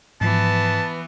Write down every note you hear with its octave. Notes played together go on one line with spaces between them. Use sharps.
G#2 E3 F3 B3 A5